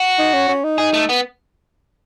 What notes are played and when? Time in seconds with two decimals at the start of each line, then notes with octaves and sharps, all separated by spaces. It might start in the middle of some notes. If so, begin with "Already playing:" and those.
Already playing: F#4
0.19 D#4
0.33 C#4
0.48 C#4
0.64 D#4
0.78 D#4 G#4
0.94 A3
1.09 B3